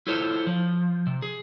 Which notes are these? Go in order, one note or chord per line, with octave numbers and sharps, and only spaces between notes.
E4 F4 A4 C5 C#5
F3
C3
G#4